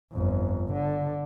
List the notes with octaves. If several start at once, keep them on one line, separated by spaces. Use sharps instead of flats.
G1 F2
D3